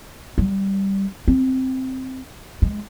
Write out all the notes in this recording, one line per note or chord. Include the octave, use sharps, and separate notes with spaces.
G3
C4
G#3